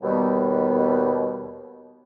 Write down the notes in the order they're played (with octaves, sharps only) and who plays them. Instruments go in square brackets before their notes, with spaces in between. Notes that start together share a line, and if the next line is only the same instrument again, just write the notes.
[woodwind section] D#2 B2 G3 B3